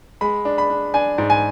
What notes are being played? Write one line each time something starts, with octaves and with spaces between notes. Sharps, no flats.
G#3 B5
D4
B5
D4
D4 G#5
G#2
G#5